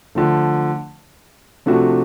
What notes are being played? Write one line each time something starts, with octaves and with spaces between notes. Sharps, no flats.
D3 F3 A3
C3 F3 A3 D4 F#4